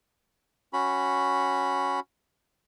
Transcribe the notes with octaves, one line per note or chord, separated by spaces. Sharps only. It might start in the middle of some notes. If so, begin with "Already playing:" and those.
C#4 F#4 B5